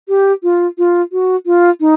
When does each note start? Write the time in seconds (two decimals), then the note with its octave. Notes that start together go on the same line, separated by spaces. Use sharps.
0.09 G4
0.43 F4
0.78 F4
1.12 F#4
1.46 F4
1.80 D#4